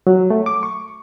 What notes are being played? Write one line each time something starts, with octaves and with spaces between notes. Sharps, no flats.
F#3
A3
D6
C#6